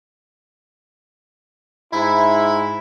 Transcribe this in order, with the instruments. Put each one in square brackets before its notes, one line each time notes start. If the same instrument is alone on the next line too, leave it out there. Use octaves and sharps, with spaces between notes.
[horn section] G#2 E4